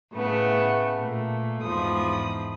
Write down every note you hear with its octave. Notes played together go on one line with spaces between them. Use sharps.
A2 C#3 A3 B3
A#2 A3
E2 G#2 F3 B5 D#6